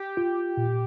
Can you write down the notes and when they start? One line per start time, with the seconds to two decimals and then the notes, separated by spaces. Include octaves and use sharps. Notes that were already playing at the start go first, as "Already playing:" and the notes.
Already playing: G4
0.17 F4
0.57 A#2